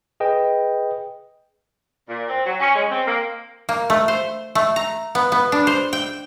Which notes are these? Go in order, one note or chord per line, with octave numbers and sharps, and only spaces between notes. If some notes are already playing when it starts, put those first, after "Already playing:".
G#4 B4 D#5 G5
A#2
C4
F#3
C#4
G#3
C4
A#3
A#3
A3
C5
A3
A#5
B3
B3
D4
C5
G5